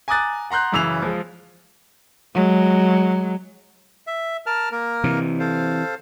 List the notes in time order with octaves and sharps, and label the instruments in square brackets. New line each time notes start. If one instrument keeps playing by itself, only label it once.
[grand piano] G#5 A#5 D6 D#6 F#6 A6
F#5 A#5 C6 F#6 G6
F#2 C#3 E3 E6 C7 F7
F3 G#3
[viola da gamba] F#3 G#3
[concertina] E5
A#4 A5 F6
A#3 A#4
[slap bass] C3 E3
[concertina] A4 C5 F5